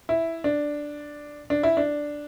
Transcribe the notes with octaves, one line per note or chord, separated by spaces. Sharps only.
E4
D4
D4
E4
D4